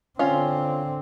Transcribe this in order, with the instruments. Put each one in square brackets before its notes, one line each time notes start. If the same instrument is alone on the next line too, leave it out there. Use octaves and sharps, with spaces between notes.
[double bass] D3 C4 [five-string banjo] C#4 F4